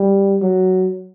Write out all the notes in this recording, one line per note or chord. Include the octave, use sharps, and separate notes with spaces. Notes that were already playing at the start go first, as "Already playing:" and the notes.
Already playing: G3
F#3